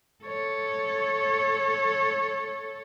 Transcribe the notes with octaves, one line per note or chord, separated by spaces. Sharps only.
A4 C#5